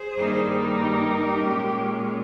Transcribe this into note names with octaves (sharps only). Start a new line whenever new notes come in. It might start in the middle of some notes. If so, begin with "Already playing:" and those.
Already playing: G#4 C5
G2 D#3 G3 A#3 D#4
G4 A#4
A#2 G#3 C#4